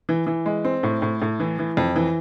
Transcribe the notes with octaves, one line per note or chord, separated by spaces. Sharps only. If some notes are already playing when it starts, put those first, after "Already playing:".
E3
E3
G#3
C4
A2
A2
A2
E3
E3
F2
E3